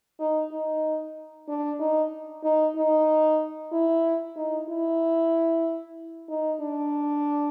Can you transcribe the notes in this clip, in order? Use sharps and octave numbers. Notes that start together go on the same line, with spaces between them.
D#4
D#4
D4
D#4
D#4
D#4
E4
D#4
E4
D#4
D4